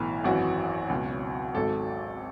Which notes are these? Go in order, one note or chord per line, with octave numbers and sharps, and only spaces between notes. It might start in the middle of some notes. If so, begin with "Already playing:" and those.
Already playing: B1 A2 E3
G#1 F#2 E3 F#4
C#2 B2 F#3
G#1 G#2 F#3 A4